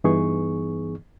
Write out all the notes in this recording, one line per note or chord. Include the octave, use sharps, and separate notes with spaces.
G2 E3 B3 D#4 G#4 C#6